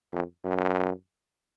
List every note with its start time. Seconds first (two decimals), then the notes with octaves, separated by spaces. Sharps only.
0.13 F2
0.44 F#2